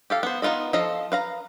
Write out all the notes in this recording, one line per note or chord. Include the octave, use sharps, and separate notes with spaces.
G4 A4 F5
B3 C5
B3 D#4 F4 A4 D#5
F3 A4 D#5 F5
B4 F5 A#5